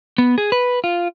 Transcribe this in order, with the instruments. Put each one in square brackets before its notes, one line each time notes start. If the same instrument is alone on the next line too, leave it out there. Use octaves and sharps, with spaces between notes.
[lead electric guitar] B3
G#4
B4
F4